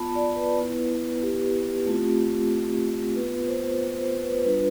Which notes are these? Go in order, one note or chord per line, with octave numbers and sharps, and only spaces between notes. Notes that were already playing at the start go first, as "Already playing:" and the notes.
Already playing: B3 F4 A5 B5
D5
B4
B3 E4
G4
A3 C4 F4
B3 F4 B4
C5
C5
C5
B4
G3 D4 F4 B4